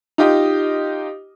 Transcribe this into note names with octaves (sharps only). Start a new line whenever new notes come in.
D#4 F4 G4 D#5